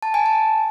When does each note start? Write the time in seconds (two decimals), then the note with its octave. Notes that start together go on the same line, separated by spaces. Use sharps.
0.02 A5
0.14 G#5
0.26 A5